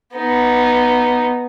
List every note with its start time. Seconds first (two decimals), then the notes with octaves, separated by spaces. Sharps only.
0.15 B3 D#4